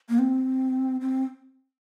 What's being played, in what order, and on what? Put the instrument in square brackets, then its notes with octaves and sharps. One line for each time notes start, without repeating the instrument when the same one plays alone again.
[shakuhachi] A#3
C4
C4